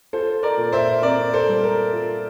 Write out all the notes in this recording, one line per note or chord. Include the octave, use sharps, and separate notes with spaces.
F4 A4 C5
A#4 D5
A#2
C5 E5
C4 A#4 D5
A4 C5
G3
A#4
F4